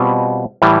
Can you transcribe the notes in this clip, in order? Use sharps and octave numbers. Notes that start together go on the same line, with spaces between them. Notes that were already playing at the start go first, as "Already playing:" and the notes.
Already playing: B2 G3 C4 F4 B4
A2 E3 G3